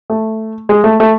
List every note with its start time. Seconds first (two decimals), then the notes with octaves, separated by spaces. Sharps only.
0.10 A3
0.69 G#3
0.84 A3
1.00 A3